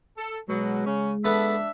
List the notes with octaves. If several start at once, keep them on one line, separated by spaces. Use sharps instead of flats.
A4
B2 F#3 G#3
C#3 C#4
B3 D4 A4 B4 E5